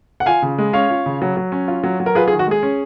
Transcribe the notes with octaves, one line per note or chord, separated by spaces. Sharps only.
F#5
F4 F5 G#5
C#3
G#3
C#4 C#5 F5
F4
C#3
F#3
F#3
C#4
F4
F#3
F#3
A#4
F4 G#4 B4
G#4
D#3
F#4
G#3 G#4
C#4